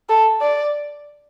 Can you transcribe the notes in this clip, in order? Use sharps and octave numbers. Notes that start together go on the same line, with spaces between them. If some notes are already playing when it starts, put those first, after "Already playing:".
A4
D5